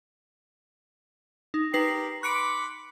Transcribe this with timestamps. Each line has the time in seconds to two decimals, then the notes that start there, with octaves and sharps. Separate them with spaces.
1.54 D#4
1.74 D#4 G4 A#4 B4 C7
2.23 B5 C6 D6 F#6 C#7 D7